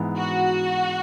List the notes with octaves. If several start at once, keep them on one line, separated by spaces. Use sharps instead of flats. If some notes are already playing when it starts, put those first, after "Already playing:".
Already playing: G#2 E3 B3
F#4